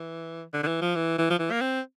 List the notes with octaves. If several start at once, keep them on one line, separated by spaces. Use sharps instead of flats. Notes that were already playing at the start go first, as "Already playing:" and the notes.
Already playing: E3
D3
D3
E3
F3
E3
E3
F3
E3
A#3
C4